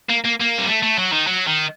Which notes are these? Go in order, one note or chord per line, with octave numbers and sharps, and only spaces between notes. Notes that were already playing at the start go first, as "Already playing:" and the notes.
A#3
A#3
A#3
G3
A3
A3
F#3
D#3
F#3
D#3